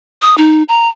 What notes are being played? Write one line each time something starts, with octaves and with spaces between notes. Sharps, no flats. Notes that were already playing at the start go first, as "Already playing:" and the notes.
D#6
D#4
A#5